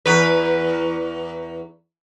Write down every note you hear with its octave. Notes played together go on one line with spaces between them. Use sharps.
E2 B4